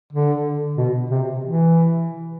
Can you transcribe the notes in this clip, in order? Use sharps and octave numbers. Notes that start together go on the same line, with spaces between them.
D3
B2
C3
E3